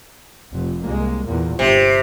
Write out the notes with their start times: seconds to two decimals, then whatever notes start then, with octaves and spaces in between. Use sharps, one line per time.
0.55 F1 F2
0.85 C2 G#3 A#3
1.26 E2 A#2 A#3
1.59 G1 C3